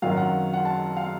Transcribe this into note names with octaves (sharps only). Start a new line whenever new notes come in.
F#2 D#3 F#3 F5
F#5
F#5
A5
F5